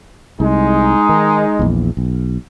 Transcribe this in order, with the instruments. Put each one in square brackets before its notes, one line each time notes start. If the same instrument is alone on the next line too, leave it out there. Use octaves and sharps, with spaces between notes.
[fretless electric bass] C2 [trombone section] G#3 D#4
[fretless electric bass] D#3
A#1 E2
B1